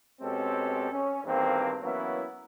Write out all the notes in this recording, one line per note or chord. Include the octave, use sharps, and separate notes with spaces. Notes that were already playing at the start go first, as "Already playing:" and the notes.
B2 G#3 C4 C#4 G4 A4
C#4
E2 G2 D#3 A#3 C4
E3 F#3 A#3 B3 C#4 E4